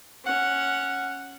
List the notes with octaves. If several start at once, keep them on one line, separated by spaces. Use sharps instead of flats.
C#4 F#5